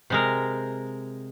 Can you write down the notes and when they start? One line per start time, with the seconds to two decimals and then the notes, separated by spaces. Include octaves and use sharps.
0.10 C3 G#3 A#4